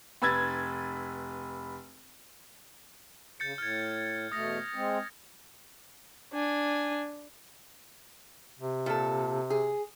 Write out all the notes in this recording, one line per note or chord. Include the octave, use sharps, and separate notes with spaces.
F1 B4 E6 G#6 A6
C#3 G6 A6 C#7
A2 F6 G#6
E2 B2 A3 D#6 A#6
G#3 C4
D4 G#5
C3
A#2 A4
G#4